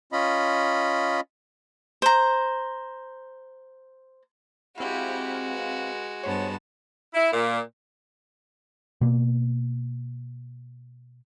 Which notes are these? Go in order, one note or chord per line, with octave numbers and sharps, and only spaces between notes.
C#4 F4 D#5 B5
C5 A#5
G#3 C4 E4 F#4 G4 F5
B4
G2 B3 C5 C#5 A5
E4
A#2
B2 A#3